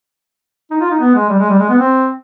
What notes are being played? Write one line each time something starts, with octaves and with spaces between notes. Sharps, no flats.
D#4
F4
D#4
B3
G#3
G3
G#3
G3
G#3
B3
C4